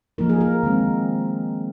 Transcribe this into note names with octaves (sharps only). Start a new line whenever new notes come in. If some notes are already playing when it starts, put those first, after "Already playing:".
F3 A#3 D#4 A#4
G#4
A#4
D#3 G#3 C4